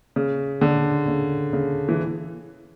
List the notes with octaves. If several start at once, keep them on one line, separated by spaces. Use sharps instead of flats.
C#3
D3
C#3
C#3
E3